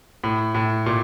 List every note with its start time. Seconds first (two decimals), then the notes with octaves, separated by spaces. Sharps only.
0.24 A2
0.55 A2
0.86 A#2